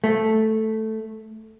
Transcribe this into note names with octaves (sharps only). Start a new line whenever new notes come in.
A3